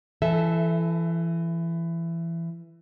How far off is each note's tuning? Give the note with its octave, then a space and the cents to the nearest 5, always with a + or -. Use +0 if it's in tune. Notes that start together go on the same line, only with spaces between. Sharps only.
E3 +20 A4 -10 E5 +0